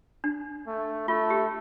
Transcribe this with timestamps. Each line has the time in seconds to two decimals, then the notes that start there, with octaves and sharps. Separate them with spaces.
0.24 D4
0.67 A3
1.08 A3 F4
1.30 G4